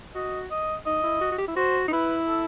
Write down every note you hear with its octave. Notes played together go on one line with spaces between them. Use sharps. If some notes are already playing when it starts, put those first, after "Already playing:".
F#4 D#5
D#5
D#4 D#5
E4
F#4
F#4
G4
E4
F#4 C5
D#4
E4 B4
A4